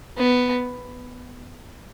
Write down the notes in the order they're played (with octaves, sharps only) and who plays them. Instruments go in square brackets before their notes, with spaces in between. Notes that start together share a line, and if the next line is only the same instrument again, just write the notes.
[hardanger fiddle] B3